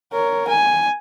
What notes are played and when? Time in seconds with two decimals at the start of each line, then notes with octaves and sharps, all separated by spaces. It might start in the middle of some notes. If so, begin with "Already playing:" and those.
0.13 A#4 C#5
0.48 G#5